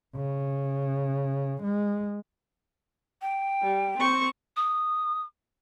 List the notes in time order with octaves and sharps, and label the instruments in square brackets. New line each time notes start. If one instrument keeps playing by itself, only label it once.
[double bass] C#3
G#3
[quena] G5
[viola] G3
C4 C#6
[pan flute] D#6